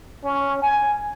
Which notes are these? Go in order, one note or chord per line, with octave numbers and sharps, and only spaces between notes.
C#4
G#5